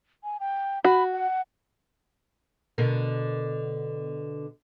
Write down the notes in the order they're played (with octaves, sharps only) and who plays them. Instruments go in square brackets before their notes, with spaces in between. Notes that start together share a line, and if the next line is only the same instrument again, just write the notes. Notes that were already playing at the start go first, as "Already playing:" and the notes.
[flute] G#5
G5
[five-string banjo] F#4 [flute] B5
[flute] F#5
[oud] B2 D3 A#4